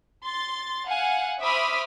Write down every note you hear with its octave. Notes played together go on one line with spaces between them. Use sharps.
C6 A6
F5 F#5 G#5
C5 E5 B5 D6 D#6 F6